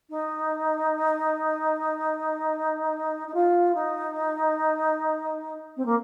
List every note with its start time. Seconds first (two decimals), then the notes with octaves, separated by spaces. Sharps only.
0.10 D#4
3.28 D#4
3.34 F4
3.75 D#4
5.77 C4
5.85 A#3